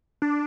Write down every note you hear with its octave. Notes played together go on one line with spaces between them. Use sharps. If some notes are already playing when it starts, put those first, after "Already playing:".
D4